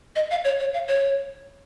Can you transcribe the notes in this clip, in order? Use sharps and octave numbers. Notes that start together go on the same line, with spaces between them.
D#5
F5
C#5
C#5
F5
C#5